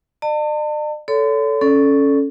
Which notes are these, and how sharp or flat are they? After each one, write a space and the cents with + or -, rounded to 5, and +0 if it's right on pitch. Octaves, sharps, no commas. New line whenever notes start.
D5 +45 A5 +40
A4 +0 C#5 +35 C6 -40
C#4 +0 A4 -5 D5 +0